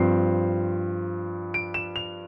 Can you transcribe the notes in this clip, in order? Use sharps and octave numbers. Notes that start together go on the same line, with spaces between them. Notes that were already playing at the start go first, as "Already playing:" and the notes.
Already playing: G2 F3 C4 C7
D7
E7
F7